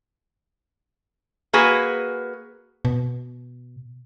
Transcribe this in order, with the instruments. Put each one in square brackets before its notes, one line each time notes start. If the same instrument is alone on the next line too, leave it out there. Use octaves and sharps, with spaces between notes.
[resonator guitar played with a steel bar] A#3 F#4 G#4 B4
[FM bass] B2